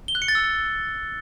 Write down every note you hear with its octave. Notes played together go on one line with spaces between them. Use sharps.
G7
F#6
C#7
A6
E6